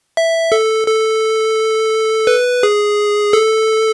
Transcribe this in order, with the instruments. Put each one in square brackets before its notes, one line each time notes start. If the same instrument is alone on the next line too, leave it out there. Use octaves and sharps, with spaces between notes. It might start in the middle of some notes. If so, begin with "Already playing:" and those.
[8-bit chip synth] E5
A4
A4
B4
G#4
A4